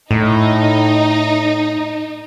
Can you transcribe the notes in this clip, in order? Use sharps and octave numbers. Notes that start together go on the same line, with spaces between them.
A2 D#4